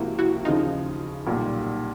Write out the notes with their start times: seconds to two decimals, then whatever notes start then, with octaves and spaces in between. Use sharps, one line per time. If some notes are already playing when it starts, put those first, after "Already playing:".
Already playing: C#2 C3 F3 A#3 E4 F#4 G4
0.19 E4 F#4
0.45 D#2 C#3 F3 D#4 F4
1.27 B1 A#2 G3